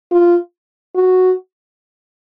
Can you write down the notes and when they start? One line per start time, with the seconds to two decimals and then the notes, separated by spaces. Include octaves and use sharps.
0.12 F4
0.95 F#4